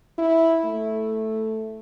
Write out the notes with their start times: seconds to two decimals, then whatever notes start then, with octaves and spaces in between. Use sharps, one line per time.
0.19 E4
0.65 A3